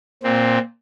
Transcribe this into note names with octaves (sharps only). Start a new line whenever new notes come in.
A#2 C4